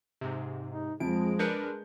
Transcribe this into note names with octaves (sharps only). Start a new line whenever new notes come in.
G#2 C3
D#4
F2 F3 G#3 D7
D4 A#4 B4 G6 C#7